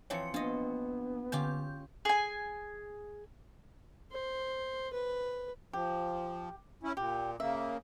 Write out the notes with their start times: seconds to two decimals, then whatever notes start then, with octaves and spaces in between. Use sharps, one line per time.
0.10 E3 F3 C4 C#5 C#7
0.34 A#3 B3 D4 F4 D#5
1.32 D3 C#4 F4 G4 G6
2.05 G#4 G#5
4.11 C5
4.93 B4
5.73 F3 G4
6.83 C#4 E4
6.97 A#2 G4
7.40 C#3 A#3 E5